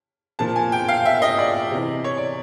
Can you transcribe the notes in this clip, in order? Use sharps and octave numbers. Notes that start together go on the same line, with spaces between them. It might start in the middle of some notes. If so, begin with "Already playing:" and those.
A#2 F3 A5
G#5
G5
F5
E5
D#5
D5
C3 E3
C#5
D5